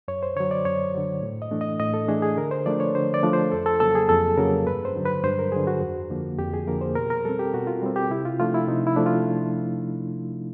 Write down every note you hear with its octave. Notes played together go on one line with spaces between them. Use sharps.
F#2 C#5
C5
D3 F#3 C#5
D5
F#2 C#5
D3 F#3
A2
D#5
E3 A3 D4
D#5
A2 D#5
A4
E3 A3 D4 G#4
G#4
D3 A#4
C5
F3 A3 D4 D5
C#5
D3 C5
D5
F3 A3 D4
C5
F2 A4
A4
C#3 F#3 A#3 A4
G#4
F2 A4
C#3 F#3 A#3 A#4
G2 B4
C5
D3 F#3
B4
G2 C5
A#4
D3 F#3 G#4
F#4
F2
D3 F3 A#3
F2 G4
G#4
D3 F3 A#3 A#4
C5
B2 A#4
A#4
G3 C4 A4
G4
B2 F#4
F4
G3 C4
G4
C3 E4
F4
F3 A3 D4 F4
E4
C3 D#4
E4
F3 A3 D4
F4